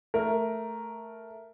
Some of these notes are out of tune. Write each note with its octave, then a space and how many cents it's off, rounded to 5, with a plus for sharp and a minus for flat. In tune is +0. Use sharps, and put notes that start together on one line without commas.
A3 +0 A#4 +0